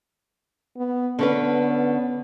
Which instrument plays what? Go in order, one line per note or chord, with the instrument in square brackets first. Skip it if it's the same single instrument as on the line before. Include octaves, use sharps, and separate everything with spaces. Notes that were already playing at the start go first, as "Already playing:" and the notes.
[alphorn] B3
[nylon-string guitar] D3 C#4 B4 [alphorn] B3